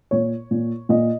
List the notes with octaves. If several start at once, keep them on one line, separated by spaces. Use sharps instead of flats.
A#2 C#5
A#2
A#2 D#5